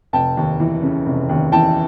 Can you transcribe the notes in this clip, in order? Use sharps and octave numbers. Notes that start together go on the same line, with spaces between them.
F1 G5 A5
D#2
E3
C#3
F1
D#2
E3 G5 A5